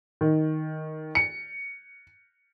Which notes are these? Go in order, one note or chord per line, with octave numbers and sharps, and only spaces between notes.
D#3
C#7